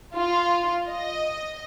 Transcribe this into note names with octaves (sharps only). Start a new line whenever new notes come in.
F4
D#5